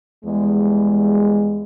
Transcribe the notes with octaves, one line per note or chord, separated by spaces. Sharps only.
E2 G3 G#3